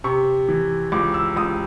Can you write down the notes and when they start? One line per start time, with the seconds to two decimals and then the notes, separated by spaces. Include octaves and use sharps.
0.04 C3 C#6
0.48 E3
0.92 C#2 D6
1.14 E6
1.36 C#2 D#6